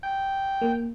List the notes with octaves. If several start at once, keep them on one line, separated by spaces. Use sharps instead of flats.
G5
A#3